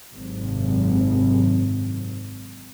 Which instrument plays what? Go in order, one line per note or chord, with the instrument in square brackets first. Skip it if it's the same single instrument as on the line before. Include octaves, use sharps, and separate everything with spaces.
[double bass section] G#1 F#2 C3